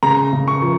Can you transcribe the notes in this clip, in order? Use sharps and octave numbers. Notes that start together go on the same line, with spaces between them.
C#3 A#5
C#3
C#6
F3